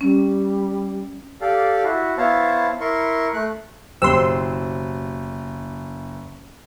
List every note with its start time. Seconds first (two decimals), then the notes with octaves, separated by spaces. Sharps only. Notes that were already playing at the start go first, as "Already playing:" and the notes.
0.01 G3 C#4
1.41 G4 A4 D5 F5
1.84 E4 F#4
2.18 B3 E4 C5 C#5 F5 A5
2.80 E4 A#4 C6 C#6
3.34 A3 F#6
4.02 F#1 B2 G4 C5 G5 C6 E6